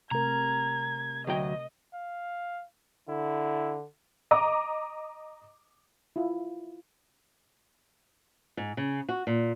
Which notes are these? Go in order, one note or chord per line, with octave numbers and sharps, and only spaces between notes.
C3 A3 A#4 A#5 G#6
D2 F#3 D#5 G5
F5
D3 E4
D#5 A#5 D6
E4 F4
G#2
C#3
F#4
A#2